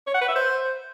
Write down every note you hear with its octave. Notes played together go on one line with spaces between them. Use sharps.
C#5
F#5
B4
E5
C5